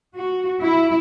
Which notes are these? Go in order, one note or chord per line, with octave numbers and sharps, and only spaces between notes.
F#4
E4